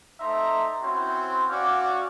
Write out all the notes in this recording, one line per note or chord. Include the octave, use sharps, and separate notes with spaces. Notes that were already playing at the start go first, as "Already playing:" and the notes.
A3 D#4 C5 E5 A#5 C6
C4 C#4 E4 F#4 C5
C#4 F#4 D5 F5 D6